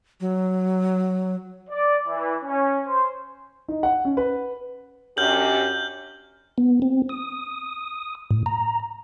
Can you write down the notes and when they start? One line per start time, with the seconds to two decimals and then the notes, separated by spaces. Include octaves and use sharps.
0.20 F#3
1.70 D5
2.07 E3
2.44 C#4
2.86 C5
3.68 D#4
3.83 F#5
4.05 C#4
4.17 B4
5.17 F#2 D4 G4 F6 G6 F#7
6.58 B3
6.82 C4
7.09 D#6
8.31 A2
8.46 A#5